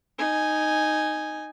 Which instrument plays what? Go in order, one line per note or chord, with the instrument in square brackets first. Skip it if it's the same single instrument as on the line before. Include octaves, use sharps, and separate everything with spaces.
[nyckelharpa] D#4 G#5